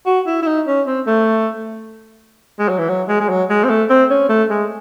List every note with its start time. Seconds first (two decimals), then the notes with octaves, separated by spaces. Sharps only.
0.06 F#4
0.27 E4
0.42 E4
0.47 D#4
0.67 C#4
0.87 C4
1.07 A3
2.59 G#3
2.69 F#3
2.79 E3
2.89 F#3
3.08 G#3
3.20 G#3
3.29 F#3
3.50 G#3
3.64 C4
3.70 A3
3.90 C4
4.10 C#4
4.29 A3
4.50 G#3